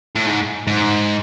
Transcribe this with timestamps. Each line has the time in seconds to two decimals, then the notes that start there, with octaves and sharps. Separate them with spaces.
0.16 A2
0.27 G#2
0.67 G#2